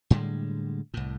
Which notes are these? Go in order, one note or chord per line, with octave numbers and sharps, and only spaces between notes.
A2 D3 G3 G#3
C2 A2